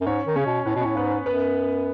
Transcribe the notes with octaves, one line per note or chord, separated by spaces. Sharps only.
F#2
G#2 C#4 C#5
D#3
C#3 C#4 C#5
B2
A2 B3 B4
B2
A2 C#4 C#5
G#2 B3 B4
B3 B4
F#2 B3 B4